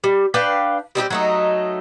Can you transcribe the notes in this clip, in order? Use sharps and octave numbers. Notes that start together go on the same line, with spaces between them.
G3
D4 B4 F5 G5
G3 C4 D#4 G4
F#3 A3 D#4